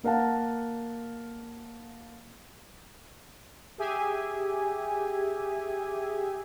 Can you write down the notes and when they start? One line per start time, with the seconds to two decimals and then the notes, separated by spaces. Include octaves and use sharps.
0.03 A#3 A#4 F5 F#5 A5
3.78 G4 G#4 E5 G#5